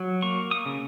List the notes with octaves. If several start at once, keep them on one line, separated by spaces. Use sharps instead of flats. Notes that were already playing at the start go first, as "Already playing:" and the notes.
Already playing: F#3
A#3 C#6
D#6
C#3